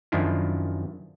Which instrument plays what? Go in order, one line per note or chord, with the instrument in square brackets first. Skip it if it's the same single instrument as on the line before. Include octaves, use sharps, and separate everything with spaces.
[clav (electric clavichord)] F#2 D#3 F3 D4 E4 F4